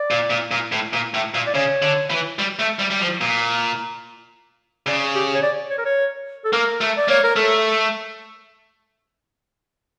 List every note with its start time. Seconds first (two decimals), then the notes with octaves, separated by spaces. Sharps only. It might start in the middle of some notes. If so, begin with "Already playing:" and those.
Already playing: D5
0.11 A#2
0.30 A#2
0.51 A#2
0.72 A2
0.93 A#2
1.14 A2
1.34 A#2
1.47 D5
1.55 C#3 C#5
1.82 D3
2.10 E3
2.39 G3
2.59 A3
2.79 G3
2.91 G3
3.01 F3
3.21 A#2
4.87 C#3 D5
5.15 G4
5.35 C#5
5.43 D5
5.70 C#5
5.78 A#4
5.85 C#5
6.45 A4
6.53 A#3 A#4
6.81 A3
6.97 D5
7.08 A#3 C#5
7.24 A#4
7.36 A3 A4